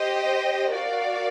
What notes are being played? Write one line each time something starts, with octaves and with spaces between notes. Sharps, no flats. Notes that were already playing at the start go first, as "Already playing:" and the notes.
Already playing: G4 C5 D#5
F#4 A#4 D5 F5